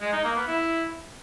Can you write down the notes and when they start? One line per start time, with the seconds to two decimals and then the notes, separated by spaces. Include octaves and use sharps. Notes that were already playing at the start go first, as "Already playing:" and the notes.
0.01 G#3
0.13 D#4
0.24 A#3
0.36 B3
0.48 E4